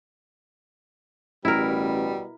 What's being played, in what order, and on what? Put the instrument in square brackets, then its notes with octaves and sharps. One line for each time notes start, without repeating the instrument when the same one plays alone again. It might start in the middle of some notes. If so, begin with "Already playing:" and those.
[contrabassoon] A1 [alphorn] B2 [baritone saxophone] G3 [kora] E4 A#4